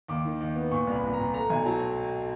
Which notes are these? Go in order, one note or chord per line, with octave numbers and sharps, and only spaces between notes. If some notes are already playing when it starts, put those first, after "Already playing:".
D#2 D6
D#3
D#2
B3
A#2 C#6
C2
B5
C2
A#5
A#2
A3 A#5
B1 G#5
F#3 A5